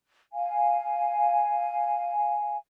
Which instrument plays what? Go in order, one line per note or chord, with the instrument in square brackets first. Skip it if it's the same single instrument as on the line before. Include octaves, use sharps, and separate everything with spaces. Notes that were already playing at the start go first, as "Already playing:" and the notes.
[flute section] F5 G#5